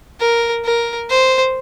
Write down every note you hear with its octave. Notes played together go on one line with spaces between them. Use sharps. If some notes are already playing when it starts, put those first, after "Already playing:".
A#4
A#4
C5